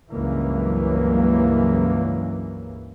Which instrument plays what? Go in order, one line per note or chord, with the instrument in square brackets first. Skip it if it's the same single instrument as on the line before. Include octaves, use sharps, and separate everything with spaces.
[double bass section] C#2 G2 C#3 E3 F#3 A#3